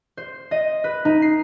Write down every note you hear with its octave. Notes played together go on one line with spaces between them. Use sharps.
C5
D#5
B4
D#4
C7